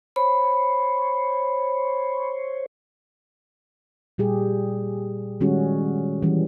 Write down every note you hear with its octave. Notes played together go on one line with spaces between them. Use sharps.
C5 C#5 B5
A#2 G3 G4 G#4
D#3 G3 G#3 C#4 F#4 G#4
E3 G3 C#4